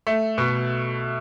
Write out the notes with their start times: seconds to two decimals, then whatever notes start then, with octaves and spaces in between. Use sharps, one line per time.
0.07 A3
0.38 B2